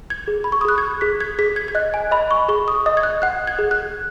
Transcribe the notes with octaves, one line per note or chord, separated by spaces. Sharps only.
G#6
G#4
B5
C#6
D#6
G#4 F#6
G#6
G#4 B6
G#6
G#4 B6
G#6
G#6
D#5 F#6
G#5
D#5 B5
C#6
G#4 C#6
D#6
D#5 D#6
G#6
F#6
F#5 F#6
G#6
G#4
F#6